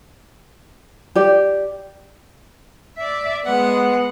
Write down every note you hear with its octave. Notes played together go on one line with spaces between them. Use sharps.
G4 D5
D5 E5
G#3 B3 F#5